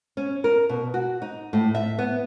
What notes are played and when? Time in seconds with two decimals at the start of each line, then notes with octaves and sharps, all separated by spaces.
0.17 C#4
0.44 A#4
0.69 B2
0.94 F#4
1.22 D#4
1.53 A2
1.75 E5
1.98 B3